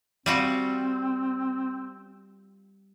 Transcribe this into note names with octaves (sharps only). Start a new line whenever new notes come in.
G3 C4 F4 F#4